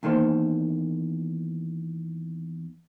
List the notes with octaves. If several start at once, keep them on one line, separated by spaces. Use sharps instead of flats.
E2 D#3 A#3 A4 C5